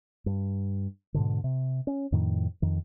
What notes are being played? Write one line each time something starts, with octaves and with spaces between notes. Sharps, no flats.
G2
G#2 B2 D3
C3
C#4
F2 A2 D#3
F2 D#3